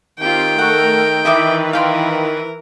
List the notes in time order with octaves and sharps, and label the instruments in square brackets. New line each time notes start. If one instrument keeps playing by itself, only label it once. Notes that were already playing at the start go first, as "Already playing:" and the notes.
[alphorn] D#3 [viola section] C4 F4 G4 [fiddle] G5
[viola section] A3 A4 A#4 [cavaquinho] F#5 C#6
[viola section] E3 B4 [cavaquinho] D#5 E5 D6
[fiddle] A#4 [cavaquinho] F5 G5 C6